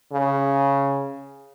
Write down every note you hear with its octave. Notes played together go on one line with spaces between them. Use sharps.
C#3